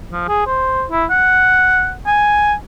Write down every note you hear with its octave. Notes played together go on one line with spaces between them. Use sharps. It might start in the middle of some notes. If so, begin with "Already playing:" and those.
F3
G#4
C5
E4
F#5
G#5